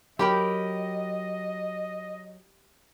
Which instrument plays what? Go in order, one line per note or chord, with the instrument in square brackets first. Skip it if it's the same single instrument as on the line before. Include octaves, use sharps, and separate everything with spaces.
[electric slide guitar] F#3 [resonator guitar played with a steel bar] G4 A#4 G5 [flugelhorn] D#5 [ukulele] B5